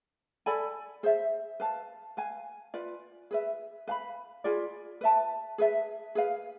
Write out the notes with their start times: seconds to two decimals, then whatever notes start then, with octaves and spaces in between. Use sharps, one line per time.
0.46 A4 D5 G#5 B5
1.03 G#4 C5 E5
1.60 B4 F5 A5
2.17 B4 F5 G#5
2.74 F4 B4 D5
3.31 G#4 B4 E5
3.87 B4 F5 G#5 B5
4.44 F4 G#4 B4 D5
5.01 B4 E5 A5
5.58 G#4 B4 E5
6.15 G#4 B4 F5